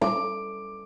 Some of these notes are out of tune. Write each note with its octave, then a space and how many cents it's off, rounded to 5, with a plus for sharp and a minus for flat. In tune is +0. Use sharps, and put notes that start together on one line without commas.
D6 +10